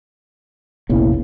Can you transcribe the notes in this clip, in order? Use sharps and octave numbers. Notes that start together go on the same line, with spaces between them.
F1 A#1 C#3 A#3 B3 E4